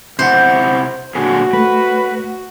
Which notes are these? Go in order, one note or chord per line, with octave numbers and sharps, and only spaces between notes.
C3 E4 C5 F#5
A#2 D3 F#4 G#4
A3 B4